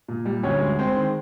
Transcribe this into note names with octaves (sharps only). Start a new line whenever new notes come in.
A#2
G3
D2 C#4 C#5
G#3
G#3 C4 C5
D#3